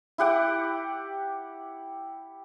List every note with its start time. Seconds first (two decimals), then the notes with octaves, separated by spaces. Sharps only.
0.18 E4 G4 F#5 D6